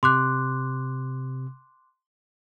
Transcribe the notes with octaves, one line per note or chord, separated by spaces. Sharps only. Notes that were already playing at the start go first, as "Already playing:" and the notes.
C3 C6 D6 F#6